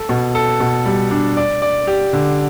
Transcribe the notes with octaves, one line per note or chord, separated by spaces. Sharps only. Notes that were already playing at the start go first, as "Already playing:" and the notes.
Already playing: A4
B2
A4
B2
G3
D4
D5
D5
G4
D3